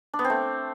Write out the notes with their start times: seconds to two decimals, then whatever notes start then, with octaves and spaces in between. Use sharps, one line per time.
0.13 D4
0.19 B3
0.24 C4
0.30 A3